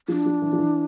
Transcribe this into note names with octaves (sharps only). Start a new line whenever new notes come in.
F3 D4
F3
E3
F3
E3